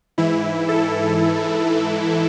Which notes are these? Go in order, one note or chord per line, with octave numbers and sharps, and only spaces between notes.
G#2 E3 E4
A4